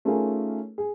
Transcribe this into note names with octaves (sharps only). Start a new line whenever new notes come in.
A3 C#4 D#4 F4 G#4 A#4
G#4